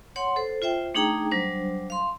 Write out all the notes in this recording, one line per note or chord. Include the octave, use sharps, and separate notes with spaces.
C#5 F#5 C6
A4 C5
F4 C5 E5 G5
A3 D4 D#4 G#4 G5 A#5
F#3 G3 D4 C5
F5 C6